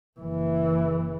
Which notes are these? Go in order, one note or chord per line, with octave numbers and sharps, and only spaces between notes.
F#1 E3